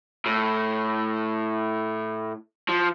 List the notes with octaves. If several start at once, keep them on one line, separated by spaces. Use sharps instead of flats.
A2
F3